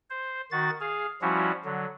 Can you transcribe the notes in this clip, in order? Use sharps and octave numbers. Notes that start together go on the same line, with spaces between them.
C5
D#3 F#4 A6
G#4 F5
F3 G3 C#4 E4 F#4
D3 F#3